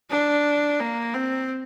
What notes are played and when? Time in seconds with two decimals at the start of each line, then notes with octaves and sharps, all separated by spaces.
0.10 D4
0.80 A#3
1.14 C4